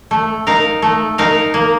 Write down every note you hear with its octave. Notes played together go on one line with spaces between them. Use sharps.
A3
D#4 A#4 F5
A3
D#4 A#4 F5
A#3